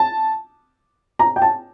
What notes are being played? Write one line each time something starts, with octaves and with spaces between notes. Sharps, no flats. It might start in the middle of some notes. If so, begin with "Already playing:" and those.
Already playing: A5
A#5
G5
A5